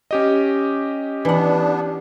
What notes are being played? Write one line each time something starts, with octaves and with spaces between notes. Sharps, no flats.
C#4 G4 D#5
E3 B3 D4 F#5